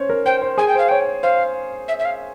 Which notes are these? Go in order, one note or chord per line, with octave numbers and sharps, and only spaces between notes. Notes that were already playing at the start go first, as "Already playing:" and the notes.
Already playing: C#4 C5 C#5
A#4
C5 G5
C5
G#4 G#5
G5
C5 F5
C#5 G5
C5 F5
E5
E5
F5